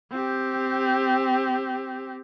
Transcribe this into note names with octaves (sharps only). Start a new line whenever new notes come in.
C4 G4